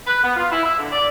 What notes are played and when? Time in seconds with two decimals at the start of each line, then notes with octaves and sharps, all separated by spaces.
0.07 B4
0.22 B3
0.36 F4
0.51 E4
0.64 E5
0.78 D3
0.92 D5